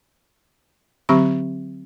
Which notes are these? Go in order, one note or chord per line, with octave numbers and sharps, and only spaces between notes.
D3 F#3 C4 G4 E5 C#6